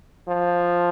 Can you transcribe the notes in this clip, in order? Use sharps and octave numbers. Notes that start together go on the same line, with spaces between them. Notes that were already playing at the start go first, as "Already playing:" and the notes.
F3